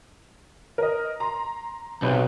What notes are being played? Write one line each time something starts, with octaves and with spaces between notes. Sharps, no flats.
A#4 D#5
A#5 C6
B1 C3 B4